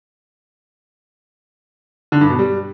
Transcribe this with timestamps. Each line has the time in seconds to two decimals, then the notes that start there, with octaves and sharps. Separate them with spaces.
2.12 D3
2.21 G2
2.30 B2
2.39 G3